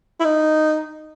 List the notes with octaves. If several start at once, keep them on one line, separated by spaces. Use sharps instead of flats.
E4
D#4